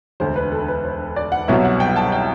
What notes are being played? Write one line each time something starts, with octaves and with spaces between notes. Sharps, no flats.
E1 D2 D3 C5
B4
A4
B4
C5
D5
F#5
C2 B2 F#3 B3 E4 E5
F#5
G5
A5
G5